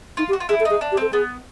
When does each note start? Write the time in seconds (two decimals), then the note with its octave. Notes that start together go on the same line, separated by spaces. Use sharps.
0.17 D#4 F4
0.29 G4
0.33 F#4
0.40 F4
0.49 E4 G#4
0.60 A4
0.65 D#4 G#4
0.81 D4
0.92 G4
0.97 C4 A4
1.12 B3 G#4